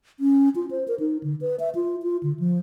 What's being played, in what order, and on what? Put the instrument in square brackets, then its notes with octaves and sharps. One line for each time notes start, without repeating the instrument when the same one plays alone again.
[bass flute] C#4
F4
C5
A#4
D#4
D3
B4
E5
F4
F4
D3
F3